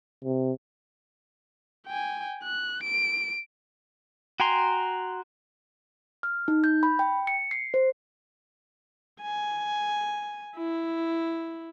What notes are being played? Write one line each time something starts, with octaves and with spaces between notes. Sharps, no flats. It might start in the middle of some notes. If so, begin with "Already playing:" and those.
C3
G5 G#5
F#6
D7
F#4 G5 G#5 A#5 C6
F6
D#4
G6
B5
G5
C#7
C7
C5
G#5
E4